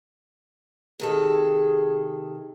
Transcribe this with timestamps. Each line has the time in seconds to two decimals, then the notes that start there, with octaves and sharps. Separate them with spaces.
1.00 C3 D#3 G#4 A4